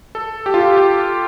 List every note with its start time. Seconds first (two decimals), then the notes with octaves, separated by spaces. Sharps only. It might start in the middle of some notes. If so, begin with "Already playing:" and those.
0.15 A4
0.46 G4
0.54 F4
0.61 G4
0.77 G4